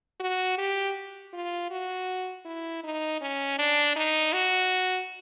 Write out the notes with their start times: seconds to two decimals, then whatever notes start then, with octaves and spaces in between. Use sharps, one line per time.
0.20 F#4
0.58 G4
1.33 F4
1.70 F#4
2.45 E4
2.84 D#4
3.21 C#4
3.59 D4
3.96 D#4
4.33 F#4